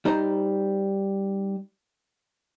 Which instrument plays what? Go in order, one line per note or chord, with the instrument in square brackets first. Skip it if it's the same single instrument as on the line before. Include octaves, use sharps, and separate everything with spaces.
[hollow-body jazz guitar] G3 D#4 C5 A#5